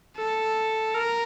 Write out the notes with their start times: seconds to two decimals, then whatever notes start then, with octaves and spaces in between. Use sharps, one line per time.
0.17 A4
0.94 A#4